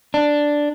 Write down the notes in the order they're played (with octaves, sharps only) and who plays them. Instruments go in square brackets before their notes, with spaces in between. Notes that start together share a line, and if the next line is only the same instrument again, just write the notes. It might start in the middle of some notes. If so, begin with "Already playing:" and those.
[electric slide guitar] D4